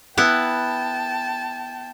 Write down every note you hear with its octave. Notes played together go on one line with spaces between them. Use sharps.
B3 E4 F#5 G5 A5